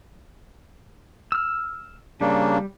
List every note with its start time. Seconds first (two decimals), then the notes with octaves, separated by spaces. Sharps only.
1.32 E6 F6
2.21 C#3 G3 A#3 D4